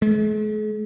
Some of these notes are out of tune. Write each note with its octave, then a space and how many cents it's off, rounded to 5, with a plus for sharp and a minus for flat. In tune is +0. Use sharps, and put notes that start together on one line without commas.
G#3 +45